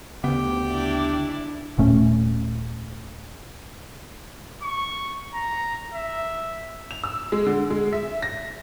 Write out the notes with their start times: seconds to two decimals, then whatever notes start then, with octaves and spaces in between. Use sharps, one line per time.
0.24 D2 C#3 B3 G4
0.68 D4 E4 D5
1.77 D#1 A#2 A3 C#4
4.63 C#6
5.34 A#5
5.94 E5
6.91 F7
7.04 E6
7.32 G#3
7.47 D3
7.70 G#3
7.93 E5
8.22 A#6